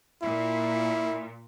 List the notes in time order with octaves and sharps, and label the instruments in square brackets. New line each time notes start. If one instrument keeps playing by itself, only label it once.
[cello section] A#2 [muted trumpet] E4